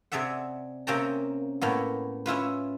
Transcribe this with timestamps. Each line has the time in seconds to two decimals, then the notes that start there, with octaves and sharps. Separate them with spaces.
0.12 C3 G#4 D5 E5 F#5
0.87 C3 A#3 C#4 G5 A5 A#5
1.61 A2 A#3 B3
2.26 C#4 E4 F4 B4